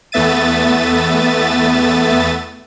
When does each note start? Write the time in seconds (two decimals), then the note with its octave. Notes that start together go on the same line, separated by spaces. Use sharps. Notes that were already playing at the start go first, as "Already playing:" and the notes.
0.12 E2 A3 B3 E5 A6 D#7